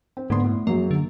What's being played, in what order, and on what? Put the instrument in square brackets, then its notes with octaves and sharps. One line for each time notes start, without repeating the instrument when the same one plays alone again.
[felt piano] C4
[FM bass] G#2 [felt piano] D3 B3 C6
[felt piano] A2
[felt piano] F#2 F#3 G#3 [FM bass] A#3
[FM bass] D3